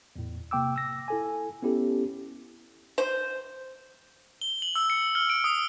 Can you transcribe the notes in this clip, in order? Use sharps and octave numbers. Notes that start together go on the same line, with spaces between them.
E2 A2
C3 A#3 G5 D6 E6
E6 A#6
E4 A4 G#5
B3 C#4 E4 G4 A4
C5
G7
F#7
E6
C#7
F6
D7
D#6